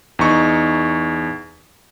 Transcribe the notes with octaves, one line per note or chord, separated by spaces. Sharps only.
E2 D#4 C#6